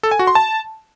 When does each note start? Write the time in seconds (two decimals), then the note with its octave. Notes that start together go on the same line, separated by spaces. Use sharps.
0.03 A4
0.11 G#5
0.19 F#4
0.27 C6
0.35 A5